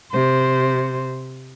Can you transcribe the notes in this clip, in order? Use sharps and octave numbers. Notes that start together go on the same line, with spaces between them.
C3 C5